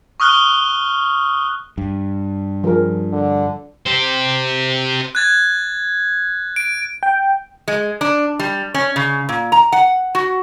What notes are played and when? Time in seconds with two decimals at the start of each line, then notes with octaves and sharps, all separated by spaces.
0.20 C#6 D#6 F6 F#6 G7
1.78 G2
2.64 F3 G#4 A#4
3.12 D3
3.86 G4 C5
5.15 F#6 G#6 A6
6.56 D7
7.03 G5
7.68 G#3
8.01 D4
8.39 G3
8.74 C#4
8.96 C#3
9.29 A#2
9.52 A#5
9.72 F#5
10.15 F#4